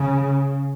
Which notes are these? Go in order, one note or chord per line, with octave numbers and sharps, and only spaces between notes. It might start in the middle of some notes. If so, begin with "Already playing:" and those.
Already playing: C#3